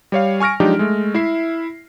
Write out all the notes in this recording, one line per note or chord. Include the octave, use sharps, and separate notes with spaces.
G3 C#5 F5
G#5 C#6 F6 A#6 D7
F3 F#3 G#3 D4 D#4 G4
G#3 A3
E4 E5 C7